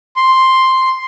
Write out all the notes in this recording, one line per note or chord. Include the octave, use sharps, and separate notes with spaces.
C6